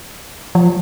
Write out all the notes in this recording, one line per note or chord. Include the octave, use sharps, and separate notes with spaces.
F3